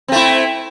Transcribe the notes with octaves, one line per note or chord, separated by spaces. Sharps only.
A3 C4 E4